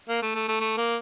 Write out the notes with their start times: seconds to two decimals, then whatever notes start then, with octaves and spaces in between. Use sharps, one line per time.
0.09 A#3
0.22 A3
0.35 A3
0.48 A3
0.60 A3
0.77 A#3